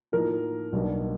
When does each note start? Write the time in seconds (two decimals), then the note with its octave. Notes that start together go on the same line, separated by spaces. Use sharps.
0.12 A2 F3 A#3 D#4 A#4
0.73 B1 B2 G3 A#3 D4